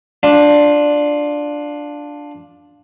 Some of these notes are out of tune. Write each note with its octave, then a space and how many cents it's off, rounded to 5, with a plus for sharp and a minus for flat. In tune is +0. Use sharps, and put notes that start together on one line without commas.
D4 +0 F4 +10